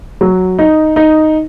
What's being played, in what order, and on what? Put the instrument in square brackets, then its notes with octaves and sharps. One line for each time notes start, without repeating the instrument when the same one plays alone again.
[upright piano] F#3
D#4
D#4